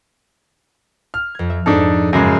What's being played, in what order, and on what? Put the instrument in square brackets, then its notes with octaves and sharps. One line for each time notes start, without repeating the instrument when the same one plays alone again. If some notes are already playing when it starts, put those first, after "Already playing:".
[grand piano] F6
[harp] F2 G#6
E5
[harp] F2 G#2 [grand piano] D4 D#4 A4
[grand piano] F#2 C#3 G#3 [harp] D6 A#6